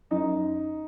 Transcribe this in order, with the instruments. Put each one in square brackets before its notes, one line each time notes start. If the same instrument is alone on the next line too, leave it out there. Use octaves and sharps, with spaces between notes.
[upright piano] F#2 D#4